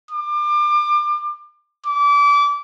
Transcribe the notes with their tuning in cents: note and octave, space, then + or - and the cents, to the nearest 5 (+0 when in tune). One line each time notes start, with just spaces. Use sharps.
D6 +30
D6 -30